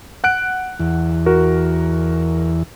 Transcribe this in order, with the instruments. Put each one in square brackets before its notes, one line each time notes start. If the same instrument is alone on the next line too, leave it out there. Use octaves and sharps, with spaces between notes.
[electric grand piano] F#5 F#6 D7
[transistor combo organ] E2
[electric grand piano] F#4 A#4